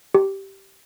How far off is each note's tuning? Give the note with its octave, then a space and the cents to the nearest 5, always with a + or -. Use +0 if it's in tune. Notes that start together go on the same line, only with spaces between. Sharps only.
G4 -10